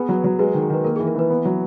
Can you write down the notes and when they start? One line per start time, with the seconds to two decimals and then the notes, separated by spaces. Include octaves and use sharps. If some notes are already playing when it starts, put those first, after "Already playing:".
Already playing: B3 G#4 B4
0.09 F#3
0.24 F#3
0.39 G#3 B4
0.54 D#3
0.62 G#4
0.70 D#3 B4
0.84 A#3 A#4
0.96 G#4
1.00 E3
1.07 A#4
1.15 E3 B4
1.30 B3
1.45 F#3